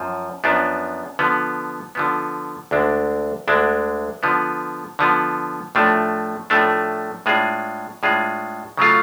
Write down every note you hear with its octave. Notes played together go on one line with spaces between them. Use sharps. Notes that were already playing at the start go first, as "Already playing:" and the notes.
Already playing: F#2 F3
F#2 F3 B3 D4
D3 F3 B3
D3 F3 B3
D2 D3 G#3 D4
D2 D3 G#3 D4
D3 F3 B3
D3 F3 B3
A2 F3 A3 D4
A2 F3 A3 D4
A2 G#3 D4 F4 G#4
A2 G#3 D4 F4 G#4
C#3 F#3 A3 F4